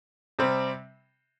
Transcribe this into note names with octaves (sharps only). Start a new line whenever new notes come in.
C3 G3 C4